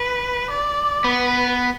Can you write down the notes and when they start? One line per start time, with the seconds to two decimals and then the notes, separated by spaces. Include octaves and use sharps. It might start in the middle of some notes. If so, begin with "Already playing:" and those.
Already playing: B4
0.50 D5
1.04 B3 B4